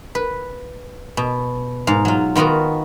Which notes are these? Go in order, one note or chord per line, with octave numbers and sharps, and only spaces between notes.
B4
B2
G#2 F5
F#3 F4
D#3 B3 F4 F#4 A#4